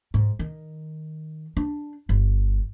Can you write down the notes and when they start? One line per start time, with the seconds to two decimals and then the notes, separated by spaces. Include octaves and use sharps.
0.14 G#2
0.39 D#3
1.57 D4
2.09 G1